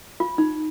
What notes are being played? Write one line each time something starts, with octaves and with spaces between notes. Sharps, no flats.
F4
D#4